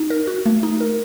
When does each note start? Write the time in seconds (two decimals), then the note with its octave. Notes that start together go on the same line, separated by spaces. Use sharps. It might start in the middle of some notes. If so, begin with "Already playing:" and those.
Already playing: D#4
0.10 A#4
0.27 F#4
0.46 A3
0.63 D#4
0.81 A#4